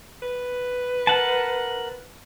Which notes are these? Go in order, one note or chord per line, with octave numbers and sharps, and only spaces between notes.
B4
A#4 F#5 A5